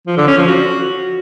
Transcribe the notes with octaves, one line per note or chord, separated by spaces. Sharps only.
F3
D3
C#4
F3
F#4